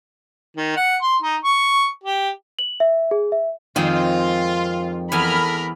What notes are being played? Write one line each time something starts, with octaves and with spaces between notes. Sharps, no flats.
D#3
F#5
C6
D#4
C#6
G4
F#7
E5
G#4
E5
F2 D#3 G#3 C4 F4
E2 A4 A#4 G#5 B5 F6